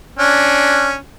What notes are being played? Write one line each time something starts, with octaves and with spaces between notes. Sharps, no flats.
C#4 D4